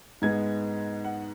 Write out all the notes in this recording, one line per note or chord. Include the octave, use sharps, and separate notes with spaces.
G#2 G#3 B3 G#6
F#5